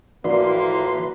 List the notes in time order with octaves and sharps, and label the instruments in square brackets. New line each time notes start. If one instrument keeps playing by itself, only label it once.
[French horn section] A2 F3 A#3 [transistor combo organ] E3 B4 C6 [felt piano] F#4 D5